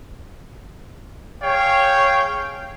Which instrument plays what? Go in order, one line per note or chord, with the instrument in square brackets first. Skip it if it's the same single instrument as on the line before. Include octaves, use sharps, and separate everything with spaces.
[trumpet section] G#4 C#5 F5 G5